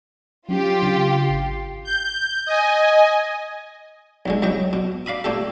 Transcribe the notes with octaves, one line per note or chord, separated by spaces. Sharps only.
F#3 C#4 F4 G4
C#3 D4
G#1 C7
G6
D#5 G#5
B1 D3 G#3
C2 F#3 D#5 G5
B2
D5 F5 B5 D#6
A#2 A3 G4 A4